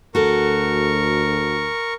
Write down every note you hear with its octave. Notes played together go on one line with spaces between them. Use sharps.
D2 F#4 A4 A#4 C#6